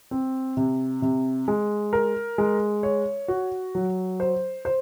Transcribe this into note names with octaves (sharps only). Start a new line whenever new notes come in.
C4
C3
C3
G#3
A#4
G#3
C#5
F#4
F#3
C5
C5